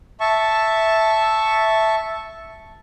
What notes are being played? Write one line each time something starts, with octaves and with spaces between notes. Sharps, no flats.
E5 A5 C#6